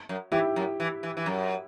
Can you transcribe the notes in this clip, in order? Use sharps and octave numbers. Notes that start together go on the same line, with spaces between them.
F#2
E3 E4 G4
F#2
E3
E3
E3
F#2